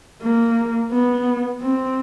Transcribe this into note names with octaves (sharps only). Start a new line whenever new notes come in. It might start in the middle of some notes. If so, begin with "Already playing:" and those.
A#3
B3
C4